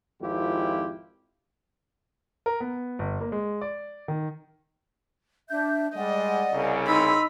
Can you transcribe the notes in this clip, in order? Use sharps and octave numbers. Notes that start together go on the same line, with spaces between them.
G#1 F2 E4 F4 G4
A#4
B3
G1
A#3
G#3
D5
D#3
D4 E5 G6
G3 G#3 D5 D#5 F#5
C2 C#3
D#4 B5 C6 E6